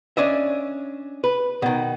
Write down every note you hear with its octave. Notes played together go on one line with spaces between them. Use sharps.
C#4 D4 D#5 E5
B4
B2 D#3